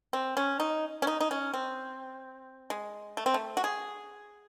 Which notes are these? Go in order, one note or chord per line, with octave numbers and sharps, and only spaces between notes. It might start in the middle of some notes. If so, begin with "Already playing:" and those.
C4
C#4
D#4
C#4
D#4
D#4
C#4
C4
G#3
A3
C4
A3
F#4
G#4